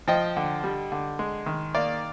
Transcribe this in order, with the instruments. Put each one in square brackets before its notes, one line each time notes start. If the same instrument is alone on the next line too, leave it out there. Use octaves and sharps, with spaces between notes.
[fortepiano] F3 D#5 G5
D3
G3
D3
G#3
D#3
A#3 D5 F5